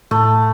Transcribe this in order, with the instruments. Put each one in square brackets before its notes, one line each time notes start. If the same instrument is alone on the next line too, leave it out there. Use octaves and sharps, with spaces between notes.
[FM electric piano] A2 [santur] A3